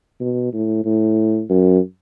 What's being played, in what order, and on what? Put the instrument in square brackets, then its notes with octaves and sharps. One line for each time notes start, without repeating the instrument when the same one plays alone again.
[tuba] B2
A2
A2
F#2